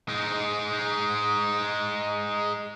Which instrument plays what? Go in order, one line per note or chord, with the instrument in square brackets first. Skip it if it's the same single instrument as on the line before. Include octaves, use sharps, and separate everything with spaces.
[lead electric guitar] G#3 D#4